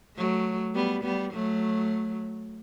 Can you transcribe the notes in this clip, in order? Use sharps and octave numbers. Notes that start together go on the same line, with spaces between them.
F#3 A3
G3 B3
G3 B3
F#3 A3